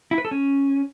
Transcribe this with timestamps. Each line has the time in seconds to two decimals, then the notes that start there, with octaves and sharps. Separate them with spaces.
0.11 E4
0.18 B4
0.25 A4
0.31 C#4